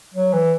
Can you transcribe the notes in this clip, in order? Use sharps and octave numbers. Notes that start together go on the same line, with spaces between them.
F#3
E3